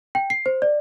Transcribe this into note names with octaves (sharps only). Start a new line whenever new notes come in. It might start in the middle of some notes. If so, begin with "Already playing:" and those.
G5
C7
C5
D5